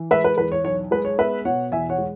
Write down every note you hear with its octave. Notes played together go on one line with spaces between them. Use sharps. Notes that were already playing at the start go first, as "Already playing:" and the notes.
Already playing: E3
G#3 B4 E5
B4
E2 B4
C#5
B1 C#5
G#3 B4
C#5
B3 B4 E5
B2 C#5 F#5
E2 E5 G#5
C#5 F#5
G#3